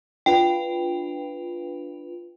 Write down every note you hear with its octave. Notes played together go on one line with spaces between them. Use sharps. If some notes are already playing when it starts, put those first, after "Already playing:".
D4 F4 B4 G5